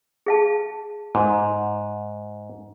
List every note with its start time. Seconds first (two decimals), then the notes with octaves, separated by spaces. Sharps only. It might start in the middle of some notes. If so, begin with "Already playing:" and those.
0.26 G#4 F5 A5
1.15 G#2